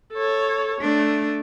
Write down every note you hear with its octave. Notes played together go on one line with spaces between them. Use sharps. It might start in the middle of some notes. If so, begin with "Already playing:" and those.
A4 C#5
A3 D4